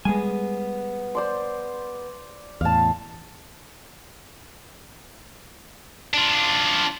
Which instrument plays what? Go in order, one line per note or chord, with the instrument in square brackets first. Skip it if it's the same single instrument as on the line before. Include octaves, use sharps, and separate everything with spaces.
[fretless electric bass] G3 G#3 [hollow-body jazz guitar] B3 G#4 G#5
[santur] C5 D5 C6
[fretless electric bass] E2 A2 [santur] F5 A5
[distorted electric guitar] D4 F4